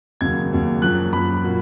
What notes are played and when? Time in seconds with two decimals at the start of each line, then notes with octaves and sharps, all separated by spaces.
0.21 D#2 C#3 F#3 A#3 G#6
0.52 D#2 C#3 F#3 A#3
0.82 F#2 F3 A#3 F#6
1.13 F#2 F3 A#3 B5
1.44 A#2 F#3 A#3